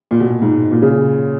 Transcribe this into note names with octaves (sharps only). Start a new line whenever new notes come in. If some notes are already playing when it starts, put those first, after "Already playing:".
A#2
B2
A#2
G#2
A#2
C#3